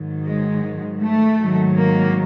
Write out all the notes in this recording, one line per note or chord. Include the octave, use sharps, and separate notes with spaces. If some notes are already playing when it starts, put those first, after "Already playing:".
Already playing: G#2 D#3 F#3
G#3
A3
G#2 D#3 F#3
A#3